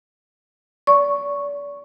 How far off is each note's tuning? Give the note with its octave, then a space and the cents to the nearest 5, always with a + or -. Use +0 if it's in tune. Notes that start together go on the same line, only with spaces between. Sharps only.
D5 -35 C#6 +0